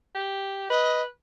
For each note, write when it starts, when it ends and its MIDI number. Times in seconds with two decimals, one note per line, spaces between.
0.15 0.69 67
0.70 1.05 71
0.70 1.02 75